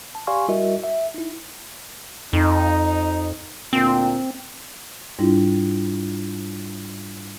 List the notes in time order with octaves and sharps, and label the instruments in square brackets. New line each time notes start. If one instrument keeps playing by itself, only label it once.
[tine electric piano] A5
G4 D5 F5 G#5 C6 C#6
G3 E4 F#4 A#4 D#5 E5
E5
D#4 E4
[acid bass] F2 [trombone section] D#4
[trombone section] D2 A#2 [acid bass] C4
[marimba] G#2 G3 D4 E4 F4